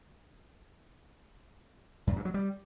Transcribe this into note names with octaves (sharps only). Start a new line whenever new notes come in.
F#2
G2
F#3
G3